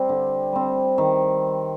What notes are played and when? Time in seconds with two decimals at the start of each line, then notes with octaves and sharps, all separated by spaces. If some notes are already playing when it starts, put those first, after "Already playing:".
Already playing: G3 C4
0.09 D3
0.53 G3 C4
0.98 D#3